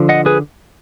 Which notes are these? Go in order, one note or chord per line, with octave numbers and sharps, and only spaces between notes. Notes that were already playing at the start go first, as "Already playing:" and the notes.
Already playing: D3 F3
D#5 F#5
G#4 B4